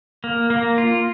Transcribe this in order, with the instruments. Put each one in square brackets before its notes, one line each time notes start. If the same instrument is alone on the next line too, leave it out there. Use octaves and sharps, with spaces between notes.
[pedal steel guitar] A#3
A#3
F4